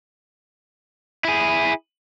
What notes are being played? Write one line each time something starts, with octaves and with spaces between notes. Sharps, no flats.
E4 G#4